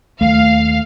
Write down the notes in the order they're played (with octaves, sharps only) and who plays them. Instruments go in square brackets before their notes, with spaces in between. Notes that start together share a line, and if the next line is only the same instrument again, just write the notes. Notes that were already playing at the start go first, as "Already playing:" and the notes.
[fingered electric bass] D#2 A3 [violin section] F5